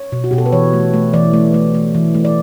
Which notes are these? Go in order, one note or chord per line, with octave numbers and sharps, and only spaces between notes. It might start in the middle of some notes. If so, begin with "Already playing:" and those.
Already playing: C#5
B2
F#4
B2 G4
A4
B4
E3 C#5
A3
A3
E3 D5
A3
A3
A3
E3
A3
D5